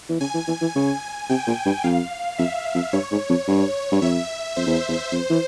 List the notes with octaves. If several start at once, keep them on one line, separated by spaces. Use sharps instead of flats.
E3
C#3 G#5
E3
E3
E3
C#3
C3 G5
A#2
G2
F2 F5
F2 E5
F2
G2 C#5
G#2
F2
G2
G2
F2 E5
F2 C5
E2
E2
F2 C5
E3